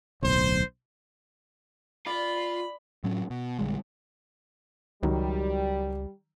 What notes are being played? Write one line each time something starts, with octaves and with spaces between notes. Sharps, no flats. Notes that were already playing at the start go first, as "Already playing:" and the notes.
D1 B1 C5
F4 D5 B5
A2 F#3 C#4
B2
A#1 D3 G3 G#3
C#2 D#3 F#3 G3